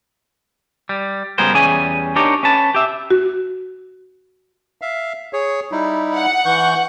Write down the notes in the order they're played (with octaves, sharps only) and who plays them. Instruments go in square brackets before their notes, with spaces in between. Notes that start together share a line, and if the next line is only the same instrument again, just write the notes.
[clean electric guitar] G3
C#2 G3 B3 G#4 A#4 C5
E2 E3 G3 C#4 G#4 G#5
D4 D#4 G4 A#4 C#5
C#4 B4 A5
G4 E5
[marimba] F#4
[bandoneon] E5 F5
G#4 C#5
G3 D#4 E4
[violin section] F#5
[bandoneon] E3 C#6 G6